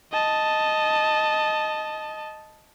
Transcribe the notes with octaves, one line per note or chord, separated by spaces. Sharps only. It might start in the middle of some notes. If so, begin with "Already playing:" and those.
D#5 A5